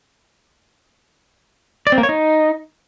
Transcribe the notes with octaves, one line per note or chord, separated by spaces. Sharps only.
D5
C4
A#3
C#5
D#4